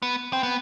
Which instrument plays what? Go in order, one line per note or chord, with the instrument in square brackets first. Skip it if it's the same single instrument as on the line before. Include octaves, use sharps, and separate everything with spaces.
[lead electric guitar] B3
C4
B3